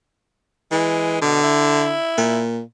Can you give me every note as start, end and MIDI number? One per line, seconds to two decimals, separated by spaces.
0.71 1.20 52
0.71 1.19 56
1.22 1.43 47
1.22 1.95 50
1.43 2.41 64
2.17 2.60 46